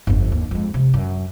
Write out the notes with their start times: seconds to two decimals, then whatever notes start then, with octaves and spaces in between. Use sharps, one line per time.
0.07 G1 F2
0.32 D#2
0.51 F2 G#3
0.74 C3
0.94 F#2